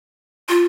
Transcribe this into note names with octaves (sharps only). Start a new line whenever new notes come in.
F4